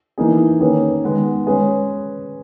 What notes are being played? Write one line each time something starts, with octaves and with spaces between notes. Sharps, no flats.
E3 A#3 D#4 G#4
D#3 A#3 C#4 G#4 B4
D#3 G#3 B3
G#3 C#4 G#4 B4